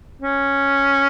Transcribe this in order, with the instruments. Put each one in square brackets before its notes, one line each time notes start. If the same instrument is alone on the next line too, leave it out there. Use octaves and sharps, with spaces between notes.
[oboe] C#4